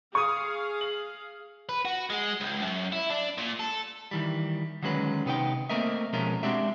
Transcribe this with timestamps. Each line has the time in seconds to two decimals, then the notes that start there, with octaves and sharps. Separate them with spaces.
0.15 G#4 F5 C#6 D#6
0.81 F#7
1.69 B4
1.85 F#4
2.10 G#3
2.40 C#2
2.62 F#2
2.92 E4
3.10 D4
3.38 A#2
3.59 A4
4.11 D#3 E3 G3
4.82 D3 D#3 F#3 G#3 C#4 B4
5.26 C3 B3 D#4 G5
5.70 A3 A#3 C4 A#4 D#5 E5
6.13 B2 F3 G#3 A3 C#4 A#4
6.43 G#3 C4 D4 F#4 G4 E5